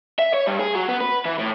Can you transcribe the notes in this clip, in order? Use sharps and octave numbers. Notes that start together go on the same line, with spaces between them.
E5
C#5
G2
G#4
F#3
B3
B4
E3
A2